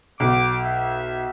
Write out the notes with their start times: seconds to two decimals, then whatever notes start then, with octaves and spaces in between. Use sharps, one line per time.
0.20 B1 D6
0.62 E5